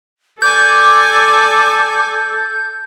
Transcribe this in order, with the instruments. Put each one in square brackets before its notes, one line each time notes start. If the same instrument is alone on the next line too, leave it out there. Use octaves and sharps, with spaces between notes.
[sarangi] A4 [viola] D5 G#5 [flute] D6 [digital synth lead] G6